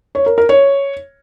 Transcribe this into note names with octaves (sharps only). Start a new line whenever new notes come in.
C#5
A#4
A#4
C#5